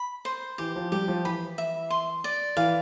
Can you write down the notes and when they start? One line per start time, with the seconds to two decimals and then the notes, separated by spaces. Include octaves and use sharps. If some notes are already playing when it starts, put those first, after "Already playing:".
Already playing: B5
0.25 C5
0.58 E3 G4
0.76 F3
0.92 G3 G4
1.08 F3
1.25 E3 B5
1.58 E5
1.90 C6
2.24 D5
2.57 E3 F5